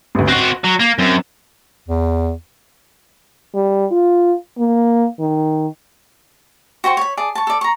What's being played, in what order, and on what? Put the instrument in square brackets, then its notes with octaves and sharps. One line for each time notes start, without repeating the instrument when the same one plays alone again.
[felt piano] A1 D2
[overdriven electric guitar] C4 F#4 [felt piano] F#6 A#6
[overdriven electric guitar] F#3
A#3
[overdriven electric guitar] F#2 [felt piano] C4 E7
[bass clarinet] E2
[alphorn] G3
F4
A#3
D#3
[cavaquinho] F#4 C5 G5 C#6
C#5 B5
G#4 D5 A5
A5 C#6
A4 D5
A#5 C#6